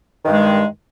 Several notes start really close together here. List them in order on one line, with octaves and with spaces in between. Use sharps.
D#3 G2 G#3